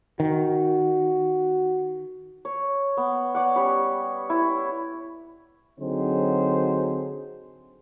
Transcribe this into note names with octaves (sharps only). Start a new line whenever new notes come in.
D#3 F#4
C#5
B3
C#5 D5 F#5
G3 C#4 B4 C#5
E4 C#5
D3 F#3 C4 D#4 G#4 C5